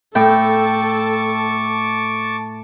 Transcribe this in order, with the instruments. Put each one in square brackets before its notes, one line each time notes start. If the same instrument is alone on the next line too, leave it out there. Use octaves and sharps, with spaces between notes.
[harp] A2 [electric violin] A4 [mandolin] G5 [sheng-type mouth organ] A5 C#6 D6